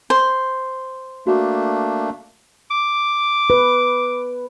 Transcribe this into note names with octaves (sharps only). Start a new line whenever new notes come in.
C5
A3 A#3 D4 F#4
D6
B4